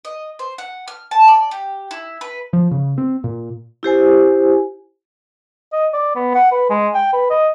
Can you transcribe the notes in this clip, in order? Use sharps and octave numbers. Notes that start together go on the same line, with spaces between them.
D#5
C5
F#5
F6
A5
D5
G4
E4
B4
F3
C#3
C4
A#2
E4 G4 C5 G#5
D#5
D5
B3
F#5
B4
G#3
G5
B4
D#5